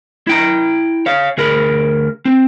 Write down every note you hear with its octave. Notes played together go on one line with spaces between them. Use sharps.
E4 G5 A#5
C#5 F5
D2 G#4 A#4 B5
C4